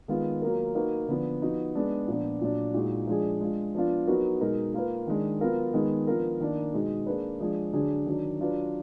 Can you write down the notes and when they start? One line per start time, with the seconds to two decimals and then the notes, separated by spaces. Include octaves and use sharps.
0.08 D#3 G#3 B3 F4
0.42 F#3 A#3 F4 A#4
0.75 A#3 D#4 F#4 B4
1.08 D3 F3 B3 D4
1.42 F3 B3 D#4 F#4
1.75 G#3 B3 D4
2.07 A#2 F3 B3 D4
2.41 A#2 F#3 D4
2.74 A#2 G#3 D#4 F#4
3.07 F3 G#3 D4 G#4
3.41 G#3 D4 F4
3.75 F3 B3 D4 F4
4.07 F#3 B3 D#4 F#4 A#4
4.40 B2 G#3 D#4 A#4
4.74 A#3 F4 B4
5.07 D#3 G#3 D4
5.41 F#3 B3 F4 A#4
5.74 D#3 G#3 B3 D#4
6.07 F3 B3 D4 F4 A#4
6.40 D#3 A#3 D4
6.74 B2 G#3 D#4
7.06 A#3 D4 G#4 B4
7.40 F3 G#3 D4 G#4
7.73 D3 F#3 D4 G#4
8.06 D#3 F#3 D4
8.40 F#3 D4 F4 B4